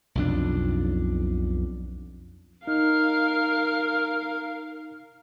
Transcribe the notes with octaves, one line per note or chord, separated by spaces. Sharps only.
B1 F2 D4
D#4 A#4 F5 F6